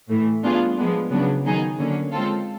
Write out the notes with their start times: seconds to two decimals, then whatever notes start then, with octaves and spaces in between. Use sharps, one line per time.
0.09 A2 E3 A3
0.44 G3 B3 D4 F4 G#4
0.77 F3 G#3 B3 D4
1.11 C#3 F#3 B3 D4
1.44 D#3 F#3 B3 D#4 G#4
1.79 D3 F#3 A#3 C#4
2.12 G#3 C4 F4 A4